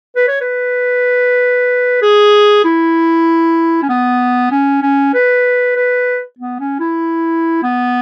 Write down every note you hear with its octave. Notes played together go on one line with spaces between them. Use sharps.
B4
C#5
B4
G#4
E4
C#4
B3
C#4
C#4
B4
B4
B3
C#4
E4
B3